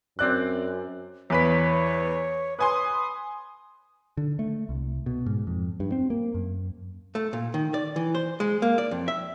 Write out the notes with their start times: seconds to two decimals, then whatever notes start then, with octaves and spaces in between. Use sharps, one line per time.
0.19 F#2 C4 D5 F#6
1.30 E2 B4 C#5 B6
2.59 B4 G#5 C6 D#6
4.17 D3
4.39 A3
4.69 C2
5.06 B2
5.26 G#2
5.47 F2
5.80 G2
5.92 C4
6.10 A#3
6.34 F#2
7.15 A3
7.33 A#2
7.54 D#3
7.74 D5
7.96 E3
8.15 C5
8.40 G#3
8.62 A#3
8.78 D5
8.91 F2
9.08 E5